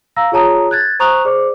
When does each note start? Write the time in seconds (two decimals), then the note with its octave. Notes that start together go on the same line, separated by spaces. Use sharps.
0.16 F5 A#5 E6 A#6
0.32 F4 G#4 C#5 A5 A#5 D#6
0.71 F#6 G#6 A6
1.00 C5 A#5 C#6 D#6 F#6 F7
1.25 G#4 C5 D5 D6